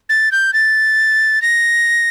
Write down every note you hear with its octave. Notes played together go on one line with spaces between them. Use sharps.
A6
G6
A6
A#6